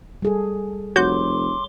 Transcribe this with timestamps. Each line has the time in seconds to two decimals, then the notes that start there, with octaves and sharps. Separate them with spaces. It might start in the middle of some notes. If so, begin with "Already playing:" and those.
0.22 G3 G#4 A4
0.96 F1 F#4 C#5 C6 D6 G6